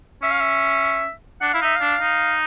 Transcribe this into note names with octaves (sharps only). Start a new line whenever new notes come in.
C#4 E5
F5
E5
D4 F#5
E4 F5
D#4 E5
F5
D4
D#4